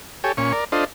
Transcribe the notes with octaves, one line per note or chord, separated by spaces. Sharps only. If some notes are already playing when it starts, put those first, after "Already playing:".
G4 A4 C#5 G#5
A#2 C#4 C#6
A#4 D5
D4 F4 A4 C5 D#5